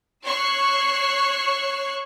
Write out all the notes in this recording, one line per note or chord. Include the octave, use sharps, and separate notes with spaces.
C#5 C#6 E6 F#6 C7